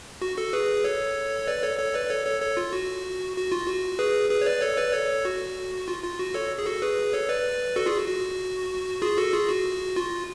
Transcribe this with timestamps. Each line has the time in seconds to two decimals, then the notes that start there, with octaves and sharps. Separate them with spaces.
0.22 F#4
0.37 F#4 A4
0.53 G#4 B4
0.84 A4 C#5
1.48 B4 D5
1.63 A4 C#5
1.79 A4 C#5
1.94 B4 D5
2.10 A4 C#5
2.26 A4 C#5
2.42 A4 C#5
2.57 F4
2.73 F#4
3.36 F#4
3.52 F4
3.68 F#4
3.99 G#4 B4
4.30 G#4 B4
4.41 C#5
4.46 B4 D5
4.62 A4 C#5
4.77 B4 D5
4.93 A4 C#5
5.25 F#4
5.88 F4
6.03 F4
6.19 F#4
6.34 A4 C#5
6.59 G#4
6.66 F#4 A4
6.82 G#4 B4
7.13 A4 C#5
7.29 B4 D5
7.76 F#4 A4
7.86 F4 G#4
7.97 F#4
8.08 F#4
9.02 F4 G#4
9.18 F#4 A4
9.34 F4 G#4
9.49 F#4
9.96 F4